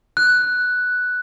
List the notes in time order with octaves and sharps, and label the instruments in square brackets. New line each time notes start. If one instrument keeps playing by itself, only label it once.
[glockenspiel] F#6